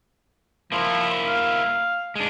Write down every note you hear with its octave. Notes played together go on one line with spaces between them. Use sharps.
F3 A#3 E4
F5
G#3 D4